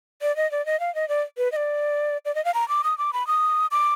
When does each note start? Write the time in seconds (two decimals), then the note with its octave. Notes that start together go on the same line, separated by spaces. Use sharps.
0.22 D5
0.36 D#5
0.51 D5
0.66 D#5
0.80 F5
0.95 D#5
1.09 D5
1.38 B4
1.52 D#5
1.56 D5
2.25 D5
2.35 D#5
2.45 F5
2.54 A#5
2.69 D6
2.84 D#6
2.98 D6
3.13 B5
3.27 D#6
3.71 D6